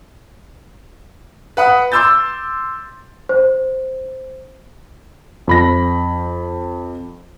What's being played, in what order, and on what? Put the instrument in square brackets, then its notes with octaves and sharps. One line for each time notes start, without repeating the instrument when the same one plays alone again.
[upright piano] B4 F#5 D#6
C6 D6 E6 G6 A6
[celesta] C5
[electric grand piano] F2 B5 A#6